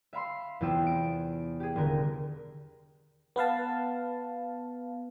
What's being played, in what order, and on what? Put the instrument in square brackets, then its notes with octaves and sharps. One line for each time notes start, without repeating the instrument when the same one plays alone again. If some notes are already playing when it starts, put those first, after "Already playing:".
[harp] E5 F5 B5 C6
E2 C3 B3 F4 G5 E6
D7
G4 G#4
D#1 D3 A#4
[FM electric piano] B3 B4 F5 A5